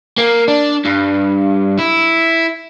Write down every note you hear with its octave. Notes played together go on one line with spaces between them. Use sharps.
A#3
D4
G2
E4